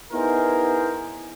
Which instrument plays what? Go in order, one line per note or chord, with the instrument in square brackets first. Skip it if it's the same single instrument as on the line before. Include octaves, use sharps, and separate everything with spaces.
[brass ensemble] B3 D#4 E4 G#4 A#4 C5